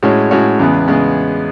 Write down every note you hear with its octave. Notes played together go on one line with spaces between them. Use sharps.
A2 G#3 C#4 F#4 C#5
A2 G#3 C#4 F#4 C#5
E2 C#3 G#3 B3
C#3 G#3 B3